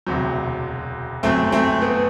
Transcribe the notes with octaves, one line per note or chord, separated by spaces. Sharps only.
E1 D2 C3 F#3
G1 F#2 F#3 A3 C4
A3 C4
B3